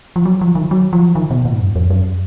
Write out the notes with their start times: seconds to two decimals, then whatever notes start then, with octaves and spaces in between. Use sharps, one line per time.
0.16 F3
0.25 F#3
0.41 F3
0.55 D#3
0.71 F#3
0.93 F3
1.15 D#3
1.31 B2
1.45 A#2
1.52 G#2
1.60 F#2
1.76 F2
1.90 F#2